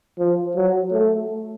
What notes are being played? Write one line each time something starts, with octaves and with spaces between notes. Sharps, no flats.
F3
F#3
A3